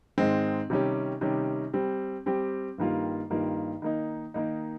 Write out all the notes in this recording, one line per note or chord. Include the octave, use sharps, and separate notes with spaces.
G#2 D#3 G#3 C4
C3 D#3 G3 C#4 G4
C3 D#3 G3 C#4 G4
G3 C4 G4
G3 C4 G4
G2 D#3 G3 A#3 F4
G2 D#3 G3 A#3 F4
D#3 A#3 D#4
D#3 A#3 D#4